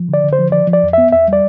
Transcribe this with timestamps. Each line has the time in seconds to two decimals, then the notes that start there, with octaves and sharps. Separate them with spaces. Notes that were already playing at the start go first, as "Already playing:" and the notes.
Already playing: F3
0.09 D3 D5
0.24 D3
0.33 C5
0.38 F3
0.52 F3 D5
0.67 F3
0.73 D5
0.83 F2
0.93 B3 E5
1.12 E2 E5
1.28 G3 D5